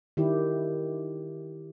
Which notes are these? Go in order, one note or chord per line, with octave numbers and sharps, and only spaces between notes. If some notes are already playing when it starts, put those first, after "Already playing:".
D#3 E4 G4